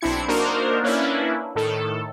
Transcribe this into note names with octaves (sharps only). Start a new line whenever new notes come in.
B1 C4 D4 E4 G#6 C#7
A#3 D4 D#4 F#4 A#4 C5
A#3 C#4 D4 E4 B4
A2 D#3 A4